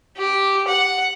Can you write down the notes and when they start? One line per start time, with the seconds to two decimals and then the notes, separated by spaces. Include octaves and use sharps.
0.18 G4
0.68 F#5